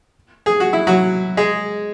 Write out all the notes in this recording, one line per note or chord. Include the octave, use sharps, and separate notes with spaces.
G#4
F#4
E4
F#3 F#4
G#3 G#4